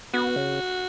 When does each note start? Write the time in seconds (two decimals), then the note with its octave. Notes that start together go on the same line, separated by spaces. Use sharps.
0.14 B3 F#4
0.36 C#3